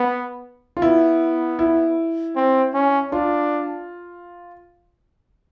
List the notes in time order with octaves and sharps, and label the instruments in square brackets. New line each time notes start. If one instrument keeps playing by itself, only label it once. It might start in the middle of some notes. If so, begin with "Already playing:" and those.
Already playing: [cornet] B3
[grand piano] F4
[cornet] B3 [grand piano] E4
[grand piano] E4
[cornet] C4
C#4
[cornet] D4 [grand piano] F4